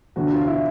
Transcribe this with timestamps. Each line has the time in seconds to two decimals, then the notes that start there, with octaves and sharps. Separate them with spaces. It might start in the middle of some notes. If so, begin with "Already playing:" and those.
0.16 E1 D2 D3 F#4
0.32 F4
0.47 E4